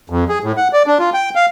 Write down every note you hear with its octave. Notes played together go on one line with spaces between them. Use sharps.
F2
G#4
A2
F#5
D5
D4
F4
G5
F5